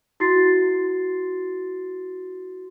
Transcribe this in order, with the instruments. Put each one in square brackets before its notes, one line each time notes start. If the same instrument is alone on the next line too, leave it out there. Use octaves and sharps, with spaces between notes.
[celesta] E4 F#4 C6 A6 C7